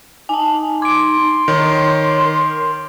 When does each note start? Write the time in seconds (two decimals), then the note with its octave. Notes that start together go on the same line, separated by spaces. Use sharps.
0.29 D#4 G#5 A5
0.82 C6 D6 D7
1.48 D#3 C#5
2.25 A#4